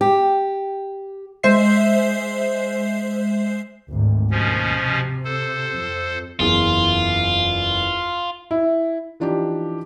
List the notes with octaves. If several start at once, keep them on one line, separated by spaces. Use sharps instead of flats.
G4
G#3 C5 E5 C7
G#1 D2
D#2 B2 F3 C#4
C3
A4 C5
F2
F#1 E2 F4 G#4
E4
E3 F3 D4 D#4 G4